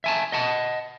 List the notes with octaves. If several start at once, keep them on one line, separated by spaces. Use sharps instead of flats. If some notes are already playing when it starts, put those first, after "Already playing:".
E5 G#5 A5
D#5 F#5 A5